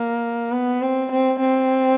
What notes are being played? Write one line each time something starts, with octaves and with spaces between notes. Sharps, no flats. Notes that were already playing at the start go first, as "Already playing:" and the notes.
Already playing: A#3
B3
C4
C4
C4